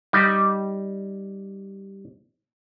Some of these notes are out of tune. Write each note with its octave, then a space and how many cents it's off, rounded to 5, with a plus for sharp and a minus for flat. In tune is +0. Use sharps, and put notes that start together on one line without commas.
G3 -5 D#4 +0